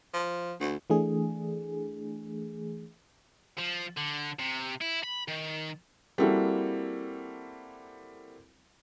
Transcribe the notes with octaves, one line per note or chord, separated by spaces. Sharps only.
F3
D2
E3 A3 D4 G#4
F3
D3
C3
E4
B5
D#3
G3 A#3 C4 E4 F#4 A4